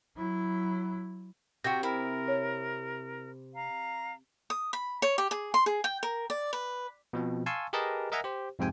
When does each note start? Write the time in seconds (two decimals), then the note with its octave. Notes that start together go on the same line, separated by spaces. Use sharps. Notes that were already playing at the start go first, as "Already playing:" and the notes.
0.15 F#3 E4
1.64 C3 F#4 E5 G5 A#6
1.83 E4 A#4
2.28 C#5
3.54 F5 A#5
4.50 D#6
4.73 B5
5.02 C#5
5.18 G4
5.31 G#4
5.54 C6
5.66 G#4
5.84 G5
6.03 A#4
6.30 D5
6.53 B4
7.13 B2 F3 C4
7.46 F5 G#5 A5 C6 C#6 E6
7.73 G4 G#4 A#4 B4 D#5 A5
8.12 A#4 D#5 E5 F#5 G#5 A#5
8.24 G4 C5
8.59 F2 G#2 C3 G5 G#5